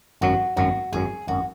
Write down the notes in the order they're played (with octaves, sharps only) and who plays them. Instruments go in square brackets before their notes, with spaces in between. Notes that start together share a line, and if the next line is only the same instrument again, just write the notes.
[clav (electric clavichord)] G#1 F#2 F#3 [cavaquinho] F#4
[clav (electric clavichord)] G#1 F#2 F#3 [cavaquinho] F#4
[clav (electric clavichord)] G#1 F#2 F#3 [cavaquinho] G#4
[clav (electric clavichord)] G#1 F#2 F#3 [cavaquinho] F#4